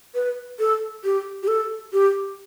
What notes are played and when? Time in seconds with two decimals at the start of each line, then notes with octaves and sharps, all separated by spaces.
0.15 B4
0.59 A4
1.04 G4
1.43 G4
1.48 A4
1.93 G4